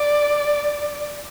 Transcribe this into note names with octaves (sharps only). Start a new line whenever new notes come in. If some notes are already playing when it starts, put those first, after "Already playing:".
Already playing: D5